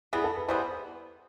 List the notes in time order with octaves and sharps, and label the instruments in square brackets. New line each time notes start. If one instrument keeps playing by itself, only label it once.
[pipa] E3 G3 B3 [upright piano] G#4
[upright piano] A4
B4
[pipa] E3 G3 B3 [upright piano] C5